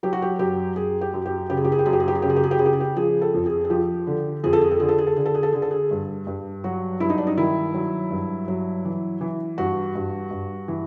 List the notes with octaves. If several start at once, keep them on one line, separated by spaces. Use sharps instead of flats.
F#3 G4
F#4
G4
F#2 G4
F#2 G#4
G4
F#2
G4
C#3 G4
G#4
G4
G#4
G4
F#2 G#4
G4
G#4
G4
G#4
C#3 G4
G#4
G4
G#4
G4
C#3 G#4
G4
G#4
G4
F3 G#4
A4
F2
G#4
G#4
F3 G4
D3
F2 G#4
A4
G#4
A4
D3 G#4
A4
G#4
A4
D3 G#4
A4
G#4
A4
D3 G#4
A4
G#4
G2
G2
F#3 F#4
G2 E4
D#4
D4
D#4
D#3 E4
F#3
G2
F#3
E3
E3
G2 F#4
G2
G2
E3